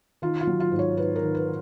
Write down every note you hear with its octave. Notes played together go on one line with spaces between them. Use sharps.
D#3 F4
F4
F#3
F4
G#2
C#5
G#2 B4
A#4
D#3
B4